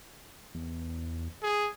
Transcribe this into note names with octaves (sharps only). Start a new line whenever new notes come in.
E2
G#4